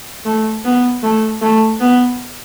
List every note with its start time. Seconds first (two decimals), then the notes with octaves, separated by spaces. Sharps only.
0.25 A3
0.65 B3
1.03 A3
1.41 A3
1.80 B3